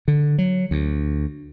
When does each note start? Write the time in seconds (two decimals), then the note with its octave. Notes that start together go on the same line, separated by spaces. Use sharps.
0.08 D3
0.38 F#3
0.71 D2